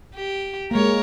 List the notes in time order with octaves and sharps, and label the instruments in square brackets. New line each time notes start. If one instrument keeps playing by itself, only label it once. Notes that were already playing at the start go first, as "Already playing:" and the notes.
[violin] G4
[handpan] G#3 A#3 [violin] A#4 C#5